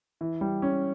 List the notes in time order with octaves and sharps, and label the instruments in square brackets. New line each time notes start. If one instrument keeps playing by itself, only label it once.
[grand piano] E3
G3
C#4